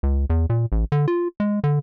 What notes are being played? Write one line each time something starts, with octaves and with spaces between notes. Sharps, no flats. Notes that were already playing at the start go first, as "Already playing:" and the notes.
C#2
E2
A#2
A1
D3
F4
G#3
D3